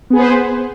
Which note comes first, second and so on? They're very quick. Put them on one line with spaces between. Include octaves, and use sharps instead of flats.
B3 G#4 B4 C5